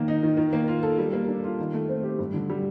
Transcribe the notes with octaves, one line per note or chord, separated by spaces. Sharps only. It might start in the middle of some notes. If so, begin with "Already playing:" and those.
Already playing: D#3 A#3
D#4
D#3
D#3
A#3
F4
A4
G3
A#3
D4
F4
D#3
A3
C4
G4
G2
D3
G3